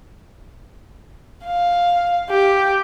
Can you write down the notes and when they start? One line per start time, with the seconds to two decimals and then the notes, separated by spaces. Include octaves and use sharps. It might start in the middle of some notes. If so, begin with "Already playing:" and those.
1.45 F5
2.30 G4